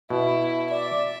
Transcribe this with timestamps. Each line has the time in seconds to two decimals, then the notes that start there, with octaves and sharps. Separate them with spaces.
0.10 B2 E4
0.70 D5 E5